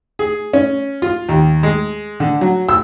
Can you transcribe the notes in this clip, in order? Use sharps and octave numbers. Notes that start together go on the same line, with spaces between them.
G#4
C#4
F4
D#2
G#3
D3
F#3
E6